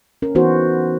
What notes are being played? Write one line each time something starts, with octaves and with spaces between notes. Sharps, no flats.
C#4 A#4
E3 B3 D#4 F#4 C5